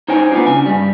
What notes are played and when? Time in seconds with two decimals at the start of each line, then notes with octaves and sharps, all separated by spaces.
0.08 D#4 C5 C#5 G5 G#5
0.32 A#3 B3 D4 F4
0.46 C#3 G#5
0.66 G2 G3